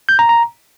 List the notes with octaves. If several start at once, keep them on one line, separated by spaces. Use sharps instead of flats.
G6
A#5
A#5